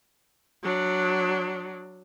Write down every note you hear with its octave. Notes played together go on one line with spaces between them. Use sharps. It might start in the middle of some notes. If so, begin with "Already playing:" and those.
F#3 D4